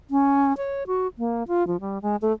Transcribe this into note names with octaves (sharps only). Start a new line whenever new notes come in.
C#4
C#5
F#4
A#3
F4
F3
G3
G#3
A3